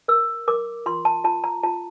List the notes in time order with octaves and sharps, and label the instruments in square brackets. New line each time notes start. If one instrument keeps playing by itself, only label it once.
[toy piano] A#4 E6
A#4 D6
F4 C6
A5
F4 A5
A#5
F4 A5